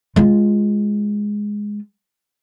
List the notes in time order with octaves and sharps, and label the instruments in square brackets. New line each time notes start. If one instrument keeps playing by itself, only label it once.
[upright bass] G#3 F4